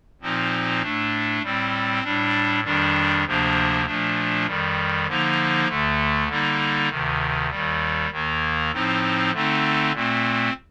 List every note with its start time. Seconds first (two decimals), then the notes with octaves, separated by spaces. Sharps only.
0.22 A#2 F3 C4 D#4
0.82 A2 A3 D4
1.43 A2 G3 C4
2.04 A2 G3 D4
2.63 F2 D#3 G3 D4
3.25 D2 C3 F3 A#3 D4
3.86 A#2 F3 A3 D4
4.46 F2 D#3 G3
5.07 D3 F3 A#3 D#4
5.68 D2 D3 A3
6.28 D3 G3 A#3 D#4
6.89 D2 C3 D#3
7.49 D#2 D#3 G3
8.10 D#2 D#3 A#3
8.71 A2 F3 C4 D#4
9.32 D3 A3 C4 D#4
9.93 A#2 A3 C4